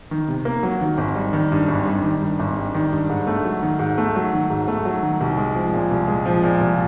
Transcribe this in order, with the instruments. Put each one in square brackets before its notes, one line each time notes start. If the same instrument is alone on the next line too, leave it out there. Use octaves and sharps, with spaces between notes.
[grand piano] D#3
C3
A#3
F#3
D#3
G#1
G3
D#3
G2
G#1
G3
D#3
G2
G#1
G3
D#3
G2
G#2
A3
F#3
D#3
G#2
A3
F#3
D#3
G#2
A3
F#3
D#3
C2
G#3
F3
A#2
C2
G#3
F3
A#2
C2